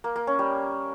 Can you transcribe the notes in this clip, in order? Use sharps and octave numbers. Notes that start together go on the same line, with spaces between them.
A#3
A#3
C#4
G3